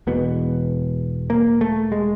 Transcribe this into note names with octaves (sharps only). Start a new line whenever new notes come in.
E1 E2 B2 B3
A#3
A3
G#3